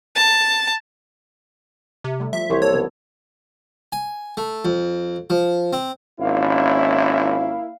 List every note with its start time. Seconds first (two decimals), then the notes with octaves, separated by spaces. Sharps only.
0.15 A5
2.04 C3
2.20 G3 A3
2.33 F3 G3 E5
2.50 C2 E3 C5 C#5
2.62 A#3 A4 C#5
2.74 C#3 F3 B3
3.92 G#5
4.37 A3
4.65 F2
5.30 F3
5.73 C4
6.20 G#1 A#3 C#4 E4 F5